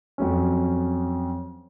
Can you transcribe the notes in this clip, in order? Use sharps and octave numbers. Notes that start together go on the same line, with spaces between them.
F2 F#3 C#4